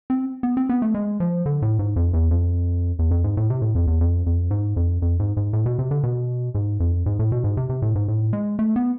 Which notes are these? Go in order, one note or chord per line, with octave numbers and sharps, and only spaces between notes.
C4
B3
C4
B3
A3
G#3
F3
D3
A2
G#2
F2
E2
F2
E2
F2
G#2
A2
C3
A2
F2
E2
F2
F2
G#2
F2
F2
G#2
G#2
A2
B2
C3
D3
B2
G#2
F2
G#2
A2
B2
G#2
C3
C3
A2
G#2
A2
G#3
A3
B3